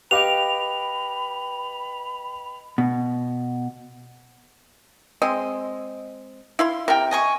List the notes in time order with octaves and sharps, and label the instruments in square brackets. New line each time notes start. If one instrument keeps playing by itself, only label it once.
[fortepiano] G4 F5 D6 [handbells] B4 D#5 G5 [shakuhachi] B5 [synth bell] F7
[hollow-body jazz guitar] B2
[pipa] G#3 C4 D#5
E4 F5 C6
[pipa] C3 [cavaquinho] A#4 G5
[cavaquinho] D#5 G#5 C#6